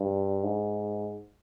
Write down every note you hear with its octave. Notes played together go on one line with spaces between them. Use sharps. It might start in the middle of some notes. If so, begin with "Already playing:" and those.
Already playing: G2
G#2